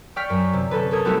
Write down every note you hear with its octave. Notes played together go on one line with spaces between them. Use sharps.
D5 G5 C#6 F6 B6
F#2
C3
C3 C#4 A4 B4
A4 A#4 D#6 G#6
G3 A3 C4 E4 F#4 G4